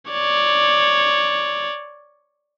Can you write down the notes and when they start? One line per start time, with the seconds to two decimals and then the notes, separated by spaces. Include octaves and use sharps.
0.11 C#5 D5